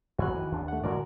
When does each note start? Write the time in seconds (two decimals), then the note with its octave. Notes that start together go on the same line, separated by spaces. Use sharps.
0.19 A1 F2 F#4 G#5 F#6
0.34 D#3 E3
0.52 D#2 D4
0.68 A3 F#5
0.84 A2 D3 G#3 F#4 A#4 D5